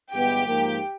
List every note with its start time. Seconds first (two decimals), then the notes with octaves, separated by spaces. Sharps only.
0.13 G1 G2 E3 G#3 B3 G4 G5
0.46 G#2 F3 A#3